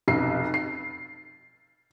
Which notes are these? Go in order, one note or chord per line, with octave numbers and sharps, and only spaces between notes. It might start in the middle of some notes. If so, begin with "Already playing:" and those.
F1 B1 C7
C7